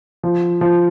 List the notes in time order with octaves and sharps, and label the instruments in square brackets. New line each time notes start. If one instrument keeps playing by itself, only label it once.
[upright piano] F3
F3